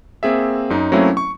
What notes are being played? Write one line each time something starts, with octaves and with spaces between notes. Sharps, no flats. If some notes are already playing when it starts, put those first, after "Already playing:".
A#3 C4 G#4 E5
F#2 D#4
F#3 A3 A#3 C4 C#4 E4
C#6